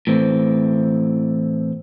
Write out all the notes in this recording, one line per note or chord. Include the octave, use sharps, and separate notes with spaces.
A2 E3 C4